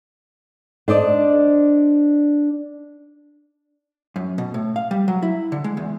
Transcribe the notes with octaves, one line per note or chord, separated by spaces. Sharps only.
D4 C5 D5 D#5
F#2
B2
A2
F5
G3
F#3
E4
D3
G#3
E2